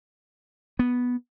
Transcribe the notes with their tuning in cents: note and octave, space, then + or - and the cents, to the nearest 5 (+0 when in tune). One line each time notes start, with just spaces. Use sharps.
B3 -5